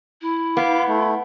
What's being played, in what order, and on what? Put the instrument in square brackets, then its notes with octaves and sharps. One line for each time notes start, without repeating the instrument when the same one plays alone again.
[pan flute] E4
[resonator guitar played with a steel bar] B3 [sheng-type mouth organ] F5 D6
[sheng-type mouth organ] A3